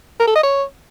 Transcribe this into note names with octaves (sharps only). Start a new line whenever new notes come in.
A#4
A4
D#5
C#5